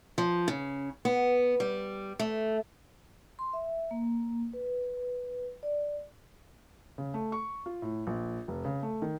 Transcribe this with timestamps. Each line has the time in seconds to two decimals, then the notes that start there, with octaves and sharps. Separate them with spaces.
0.18 F3
0.48 C#3
1.05 B3
1.60 G3
2.19 A3
3.39 C6
3.53 E5
3.91 A#3
4.53 B4
5.63 D5
6.98 C#3
7.14 A3
7.32 C#6
7.66 F4
7.82 A2
8.07 A#1
8.48 F1
8.65 C#3
8.82 A3
9.02 D#3